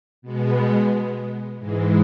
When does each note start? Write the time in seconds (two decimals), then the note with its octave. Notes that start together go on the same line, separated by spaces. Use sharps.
0.22 B2 G#3 B3
1.59 G#2 E3 G#3